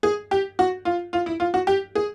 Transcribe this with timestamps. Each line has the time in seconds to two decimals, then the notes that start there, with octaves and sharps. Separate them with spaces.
0.03 G#4
0.31 G4
0.59 F#4
0.85 F4
1.13 F4
1.26 E4
1.40 F4
1.54 F#4
1.67 G4
1.95 G#4